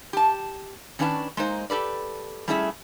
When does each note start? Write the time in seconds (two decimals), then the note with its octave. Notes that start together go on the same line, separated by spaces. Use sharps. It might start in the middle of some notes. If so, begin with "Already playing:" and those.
0.13 G4 A5
0.99 D#3 C#4 D4 B4 F5 A5
1.37 G#3 A#3 D#4 C5
1.70 G4 A4 B4 D5
2.48 G3 A3 C#4 E4 G#4 E5